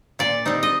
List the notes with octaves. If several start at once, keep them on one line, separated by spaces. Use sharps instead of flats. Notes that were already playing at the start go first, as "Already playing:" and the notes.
A#2 D5
G3 C4 D#4
D#5